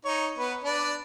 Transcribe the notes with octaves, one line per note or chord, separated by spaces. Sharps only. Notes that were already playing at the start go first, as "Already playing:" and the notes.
D#4 C#5
B3 B4
D4 B4 D5